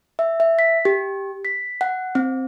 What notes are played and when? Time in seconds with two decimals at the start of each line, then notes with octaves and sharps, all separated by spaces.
0.19 E5
0.40 E5
0.59 B6
0.85 G4
1.45 B6
1.81 F#5
2.15 C4